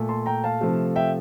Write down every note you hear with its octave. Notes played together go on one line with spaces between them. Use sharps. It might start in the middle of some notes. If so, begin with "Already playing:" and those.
Already playing: A#2 A3
A5 C6
G5 A#5
F5 A5
C3 F3 A3
E5 G5